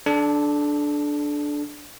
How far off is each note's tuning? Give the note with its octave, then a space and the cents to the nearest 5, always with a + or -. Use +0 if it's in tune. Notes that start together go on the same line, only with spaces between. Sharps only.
D4 +0 A4 -30